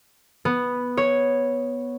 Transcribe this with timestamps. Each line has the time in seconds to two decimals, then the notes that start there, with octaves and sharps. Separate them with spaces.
0.45 B3
0.97 C#5